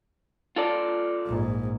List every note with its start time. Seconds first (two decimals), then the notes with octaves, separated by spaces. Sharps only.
0.56 F4 A4 D5
1.27 A#1 G#2